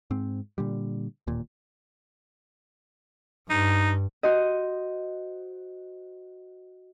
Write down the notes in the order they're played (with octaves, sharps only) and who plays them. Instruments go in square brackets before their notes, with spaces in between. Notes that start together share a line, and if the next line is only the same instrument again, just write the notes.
[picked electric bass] G#2 C4
A#2 D3 G3
D1 D#2 A#2
[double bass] G2 [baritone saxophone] D#4
[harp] F#4 C5 D#5